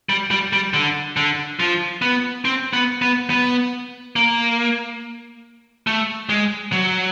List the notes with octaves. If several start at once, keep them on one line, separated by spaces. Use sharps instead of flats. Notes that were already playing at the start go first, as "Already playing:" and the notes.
G3
G3
G3
D3
D3
F3
B3
C4
B3
B3
B3
A#3
A3
G#3
F#3